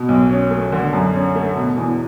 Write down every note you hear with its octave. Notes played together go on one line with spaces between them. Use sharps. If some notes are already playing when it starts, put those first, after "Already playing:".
Already playing: B2
B1
C#4
A3
D3
F#2
C#4
A3
B2
E2